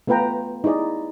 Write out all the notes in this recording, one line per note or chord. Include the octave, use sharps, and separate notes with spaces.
A3 B3 F4 B4 G5 A#5
D#4 E4 G#4 D5 D#5